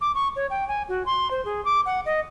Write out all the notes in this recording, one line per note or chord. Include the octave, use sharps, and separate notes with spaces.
D6
C#6
C#5
G5
G#5
F#4
C6
C5
G#4
D6
F#5
D#5